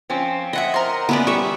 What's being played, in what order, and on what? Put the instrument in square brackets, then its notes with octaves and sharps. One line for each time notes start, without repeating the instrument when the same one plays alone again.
[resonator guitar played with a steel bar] F3 C4 C#4
[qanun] D#5 [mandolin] E5 F#5 B5
[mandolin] A#4 C5
[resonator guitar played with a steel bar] E3 C#4 [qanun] B3 B4 D5
[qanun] G3 E5 [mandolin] C#6